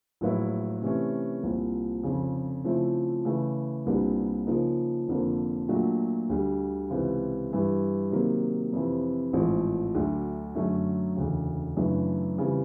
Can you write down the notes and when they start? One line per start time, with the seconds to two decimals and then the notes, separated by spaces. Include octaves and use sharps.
0.21 A#1 A2 F#3 B3 E4
0.82 C3 E3 A3 C#4
1.43 C2 A#2 F3
2.03 F1 F2 C#3
2.64 C#3 F3 A3 C4 E4
3.25 C#3 E3 A3
3.86 C2 A#2 G3 B3 D4
4.47 C#3 F3 A#3 D#4
5.08 F1 F2 D3 F3 A#3
5.69 A#2 F#3 A3 D4 F#4
6.30 D2 D3 G3
6.90 C#2 C3 E3
7.51 G2 E3 G3
8.12 C3 D#3 F#3 A#3
8.73 F2 C3 E3
9.33 A1 G#2 F3 A3 C4
9.95 D2 D3 F#3 A3 D4
10.55 F#2 D3 F#3 A3 C#4
11.16 E1 D2 C#3
11.77 F#2 C#3 E3 A3 D4
12.37 F2 C#3 E3 G3